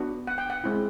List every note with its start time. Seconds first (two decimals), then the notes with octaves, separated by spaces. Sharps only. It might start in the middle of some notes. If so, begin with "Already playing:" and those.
Already playing: B3 D4 F#4
0.27 F#5
0.38 G5
0.50 F#5
0.64 G#3 C4 E4